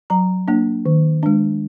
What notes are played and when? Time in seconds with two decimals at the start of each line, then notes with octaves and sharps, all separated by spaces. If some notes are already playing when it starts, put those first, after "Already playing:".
0.10 F#3 A#5
0.48 A#3 D4
0.86 D#3
1.23 G#3 D4